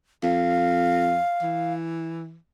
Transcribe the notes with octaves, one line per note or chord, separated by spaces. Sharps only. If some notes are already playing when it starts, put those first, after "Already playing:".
F2 F5
E3